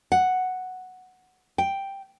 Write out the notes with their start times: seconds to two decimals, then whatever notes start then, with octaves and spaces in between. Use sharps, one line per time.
0.12 F#5
1.58 G5